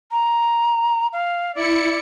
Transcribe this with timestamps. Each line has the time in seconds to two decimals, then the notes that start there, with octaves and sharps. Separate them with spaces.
0.12 A#5
1.13 F5
1.55 E4 D5 C#7